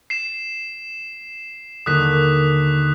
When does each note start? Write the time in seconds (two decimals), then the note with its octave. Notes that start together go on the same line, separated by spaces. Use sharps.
0.10 C7 E7
1.86 D#2 D3 D#6 F#6 B6